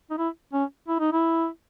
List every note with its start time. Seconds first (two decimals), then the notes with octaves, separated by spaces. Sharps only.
0.10 D#4
0.18 E4
0.53 C#4
0.88 E4
1.00 D#4
1.12 E4